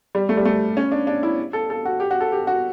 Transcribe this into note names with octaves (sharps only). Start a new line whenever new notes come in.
G3
A3
G3
A3
C#4
D4
D4
E4
A4
A4
F#4
G4
F#4
A4
G4
F#4